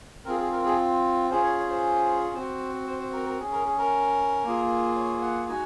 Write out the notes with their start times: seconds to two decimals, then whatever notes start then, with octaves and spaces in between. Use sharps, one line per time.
0.25 C4 F4 G#4 A#4
0.39 G#4
0.52 A#4
0.65 G#4
1.30 C#4 F4 G#4 C5
1.43 C#5
1.56 C#5
1.69 C5
2.34 C4 F#4 C5
2.87 C5
3.00 C5
3.12 A#4
3.26 A#4
3.39 C#4 G#4
3.52 A#4
3.65 G#4
3.78 A#4
4.44 A#3 F4 G#4
4.96 C#5
5.22 F#5
5.48 G#3 D#4 F#4 G#5